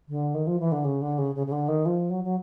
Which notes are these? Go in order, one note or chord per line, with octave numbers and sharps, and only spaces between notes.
D3
D#3
F3
E3
D3
C#3
D3
C#3
C#3
C#3
D3
D#3
F3
F#3
F#3